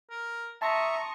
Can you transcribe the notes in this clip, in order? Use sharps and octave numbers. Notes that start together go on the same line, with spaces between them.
A#4
E5 A5 A#5 C6 C#6 D#6 A#6